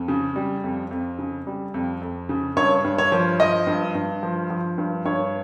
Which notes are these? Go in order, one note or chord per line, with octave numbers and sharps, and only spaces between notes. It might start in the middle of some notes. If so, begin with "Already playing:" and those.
Already playing: F2
C#3
G3
F2
F2
C#3
G3
F2
F2
C#3
G2 C#5
G2
C#5
F3
F3 D#5
G2
G2
F3
F3
G2
G2 C#5